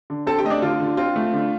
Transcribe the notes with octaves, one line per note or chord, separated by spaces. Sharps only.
D3
C4 A4 A5
G4 G5
A3 D#5
D4 D5
D3 F4
D3
C4 F4
A3
D3